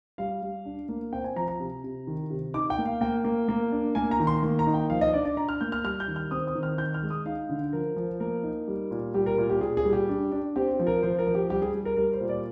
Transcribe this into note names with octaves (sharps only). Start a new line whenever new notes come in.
G3 F5
G3
D4
A#3
C4 G5
G#5
F3 A#5
A#5
C3
C3
D#3
C3
D#4 D6
G5
A#3
F5
A#3 G5
A#3
A#3
D4
A#3 G#5
A#5
D#3
C6
A#3
A#5
D#4
G5
F3 F5
D#5
D4 D5
D5
D4 A#5
F6
A#3 G6
F6
G3 F6
G6
D#3
F6
C4 D#6
D#6
D#3
F6
D#4 G6
F6
G#3
D#6
D#4 F5
D3
F3 A#4
F3
A#3 A#4
D#4
G3
A#2
G3 G4
A#4
A#2
G4
A#2 G#4
G#4
G3
G4
D4
D4
C4 G4
F3
A#4
F3 C5
A#4
F3
G4
G3 G4
G#4
G3
A#4
G3 A#4
C5
A#2
D5